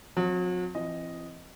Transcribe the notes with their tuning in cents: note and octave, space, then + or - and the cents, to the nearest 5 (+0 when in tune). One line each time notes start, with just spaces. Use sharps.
F#3 -40 C4 +0
E3 +40 C4 +0 D#5 +0